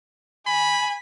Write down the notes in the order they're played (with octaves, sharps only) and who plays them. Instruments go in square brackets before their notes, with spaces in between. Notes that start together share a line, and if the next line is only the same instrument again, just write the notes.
[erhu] G#5 [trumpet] B5